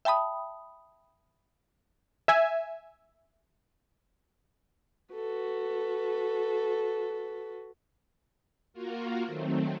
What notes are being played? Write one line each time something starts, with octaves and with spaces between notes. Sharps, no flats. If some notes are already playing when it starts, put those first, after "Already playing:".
E5 G5 A5 B5 D#6
E5 G#5
F#4 A4 B4
A#3 F4 F#4 A#4
D#3 F#3 A3 C4